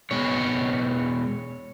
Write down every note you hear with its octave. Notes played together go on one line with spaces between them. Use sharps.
B2 G#3 B3 C#5